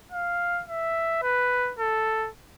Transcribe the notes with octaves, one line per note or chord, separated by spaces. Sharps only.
F5
E5
B4
A4